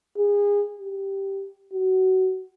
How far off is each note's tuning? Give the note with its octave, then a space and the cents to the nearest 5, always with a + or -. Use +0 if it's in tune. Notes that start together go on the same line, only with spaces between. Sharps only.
G#4 -25
G4 -5
F#4 +20